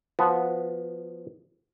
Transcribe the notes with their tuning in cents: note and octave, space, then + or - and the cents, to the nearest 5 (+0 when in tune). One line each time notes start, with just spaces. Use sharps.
F3 +0 B3 +0 F#4 -30